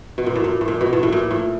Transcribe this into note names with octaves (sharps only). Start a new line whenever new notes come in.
B2
A#2
A2
A#2
A2
A#2
B2
A2
A2
A#2
A2